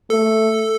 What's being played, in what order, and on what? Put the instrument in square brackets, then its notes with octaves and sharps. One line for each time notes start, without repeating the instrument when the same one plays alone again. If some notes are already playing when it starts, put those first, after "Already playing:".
[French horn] A3 [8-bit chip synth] A4